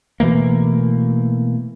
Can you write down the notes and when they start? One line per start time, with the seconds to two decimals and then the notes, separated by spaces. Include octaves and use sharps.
0.20 B2 E3 A3 A#3